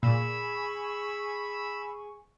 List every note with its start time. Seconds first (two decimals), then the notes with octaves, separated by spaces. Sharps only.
0.03 A#2 G#4 G#5 B5 C#6 E6